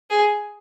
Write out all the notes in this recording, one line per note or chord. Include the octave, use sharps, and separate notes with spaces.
G#4